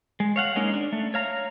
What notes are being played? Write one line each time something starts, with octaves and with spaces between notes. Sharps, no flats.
G#3
C#5 F5 F#5
G#3 A#3 C#4 D#4
D4
A3
C#5 F5 A#5